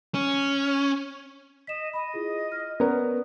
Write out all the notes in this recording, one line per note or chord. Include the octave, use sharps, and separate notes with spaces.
C#4
D#5 B6 E7
D#5 B5
E4 F4 G#4
F6
B3 C#4 A#4 D5